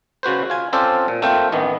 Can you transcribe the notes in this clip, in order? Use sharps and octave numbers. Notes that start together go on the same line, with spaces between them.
C#3 F#4 B4 C5
F4 G#5
C4 C#4 F4 A4 C5 D5
A#2
A3 A#3 C4 F4 G5
A1 D#3 E3 B3